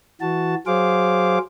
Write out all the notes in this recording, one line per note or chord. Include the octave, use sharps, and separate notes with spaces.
E3 F#4 A5
F#3 G#4 C5 F5 D6